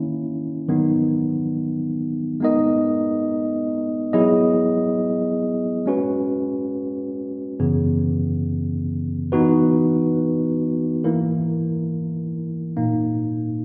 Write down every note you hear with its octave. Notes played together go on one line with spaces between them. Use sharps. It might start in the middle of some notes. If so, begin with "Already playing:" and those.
Already playing: D#3 A#3 C#4 E4
D#3 F#3 B3 D#4
G#3 B3 D#4 A#4 D#5
F#3 B3 E4 G#4 D#5
G#3 C#4 F#4 B4
F#2 C#3 E3 B3
E3 B3 D#4 F#4 B4
E3 A#3 E4 A#4
A#2 A#3 D#4